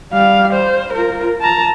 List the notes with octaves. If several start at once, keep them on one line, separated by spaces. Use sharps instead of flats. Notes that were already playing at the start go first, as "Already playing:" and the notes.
G3 F5
C5
F4 A#4
A5 A#5